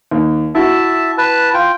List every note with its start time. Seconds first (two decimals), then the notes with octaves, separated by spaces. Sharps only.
0.11 D#2
0.55 E4 F#4 E5 A5
1.18 B4 A5
1.54 F4 G5